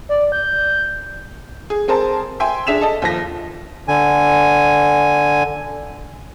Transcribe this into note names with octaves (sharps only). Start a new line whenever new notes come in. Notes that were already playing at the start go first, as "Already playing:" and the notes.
D5
G6
G#4
C4 G#4 A#4 C5 A5
E5 G5 G#5 C6
D4 G#4 E5 B6 E7 F7
A4 D#5 A5
D#2 F3 A#6
D3 G#5